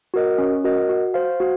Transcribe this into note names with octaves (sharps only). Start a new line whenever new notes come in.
F#4 A#4 D#5
C#4
F#4 A#4 D#5
F#4
C5 F5
F#4